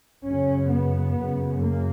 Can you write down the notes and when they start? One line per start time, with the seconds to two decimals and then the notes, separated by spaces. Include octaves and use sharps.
0.24 F#2 C#3 C#4
0.70 B3
1.15 F#2 C#3
1.61 A#3